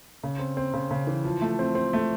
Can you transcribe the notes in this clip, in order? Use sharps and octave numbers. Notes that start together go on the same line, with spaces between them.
C#3
C4
C4
C#3
C#3
E3
F3
A3
C4
C4
A3